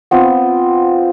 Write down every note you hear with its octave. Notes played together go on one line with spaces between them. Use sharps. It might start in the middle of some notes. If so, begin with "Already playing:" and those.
B3 C4 F4